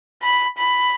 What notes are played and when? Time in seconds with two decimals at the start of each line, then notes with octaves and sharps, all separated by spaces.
0.23 B5
0.58 B5